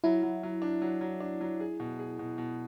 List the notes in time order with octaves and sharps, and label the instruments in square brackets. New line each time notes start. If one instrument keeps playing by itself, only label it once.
[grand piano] F#3 [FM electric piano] E4
[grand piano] F#3
F#3
D4
F#3
F#3
D4
F#3
G#4
B2
G#4
B2
B2